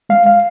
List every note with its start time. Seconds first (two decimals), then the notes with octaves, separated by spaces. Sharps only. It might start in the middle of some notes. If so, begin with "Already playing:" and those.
0.09 G#3 F5
0.26 F5